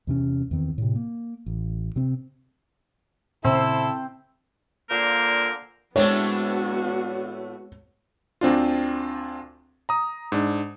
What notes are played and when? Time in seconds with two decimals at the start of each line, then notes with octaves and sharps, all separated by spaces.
0.07 E2 C3 C#4
0.51 E2 D#3 C4
0.78 A2 C3
0.95 A#3
1.46 A1
1.96 C3 C4
3.45 A#2 C#3 C4 E4 A4
4.90 A#2 D3 A#3 A#4 C5
5.96 A2 G#3 A3 B3 C4 D4 F#4 C#5
8.41 D2 C4 D4 F4
9.89 A#5 D#6
10.32 G#2 D4